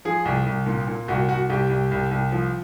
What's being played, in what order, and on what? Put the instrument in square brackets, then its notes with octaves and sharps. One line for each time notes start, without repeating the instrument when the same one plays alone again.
[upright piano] F3 G#4
C2
C2
A#2
A#2
C2 F#4
C2 F#4
C2 G4
C2
C2
C2
F3